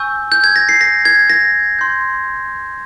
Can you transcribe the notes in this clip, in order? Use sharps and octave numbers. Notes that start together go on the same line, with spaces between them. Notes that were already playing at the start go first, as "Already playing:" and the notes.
Already playing: G#5 C#6 E6 G6
G6
G#6
A#6
C7
A#6
G#6
A#6
C6 G6